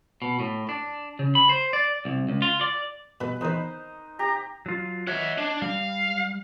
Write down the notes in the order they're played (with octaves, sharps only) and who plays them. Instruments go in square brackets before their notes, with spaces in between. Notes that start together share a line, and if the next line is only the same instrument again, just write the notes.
[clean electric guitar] B2
A2
D4
C#3
B5
C5
D5
C2
C#2
F4
D5
[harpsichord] G2 B2 [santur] B4
[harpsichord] E2 D#3 [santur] D#4 C5
[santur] G4 [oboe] A#5
[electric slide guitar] F#3 F4
[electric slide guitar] C#5 D#5 [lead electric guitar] E5 F#5
[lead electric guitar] D4
[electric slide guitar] G3 [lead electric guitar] F5